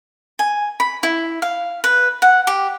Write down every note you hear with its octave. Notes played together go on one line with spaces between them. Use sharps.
G#5
B5
E4
F5
B4
F#5
G4